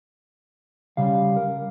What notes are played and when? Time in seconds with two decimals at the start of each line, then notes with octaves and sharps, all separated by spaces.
0.97 C#3 G3 F5
1.36 A#4